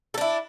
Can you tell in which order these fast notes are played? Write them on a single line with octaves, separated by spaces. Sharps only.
A4 D4 E4